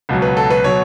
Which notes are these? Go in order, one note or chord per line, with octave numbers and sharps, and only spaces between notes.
C#2 B2 F#3
B4
A4
B4
B2 F#3 C#5